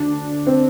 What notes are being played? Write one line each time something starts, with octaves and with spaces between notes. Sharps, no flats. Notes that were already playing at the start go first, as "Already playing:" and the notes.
Already playing: D2 D3 D4
C4